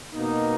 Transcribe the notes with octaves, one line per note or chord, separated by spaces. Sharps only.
B2 A#3 D#4